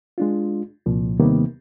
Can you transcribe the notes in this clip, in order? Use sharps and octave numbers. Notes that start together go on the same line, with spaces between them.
G#3 D4 F4
C2 A#2 F3
D#2 C3 D#3 G3 A#3 B3